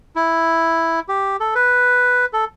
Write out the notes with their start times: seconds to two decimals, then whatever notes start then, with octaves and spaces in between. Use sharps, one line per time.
0.16 E4
1.08 G4
1.40 A4
1.55 B4
2.33 A4